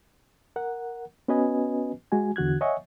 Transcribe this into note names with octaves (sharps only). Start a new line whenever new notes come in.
A#4 F#5
B3 C#4 F#4 B4 D#5 G#5
G#3 F#4 G#5
E2 D3 F#4 F#6 G#6
C#5 D#5 E5 F#5 G#5 C#6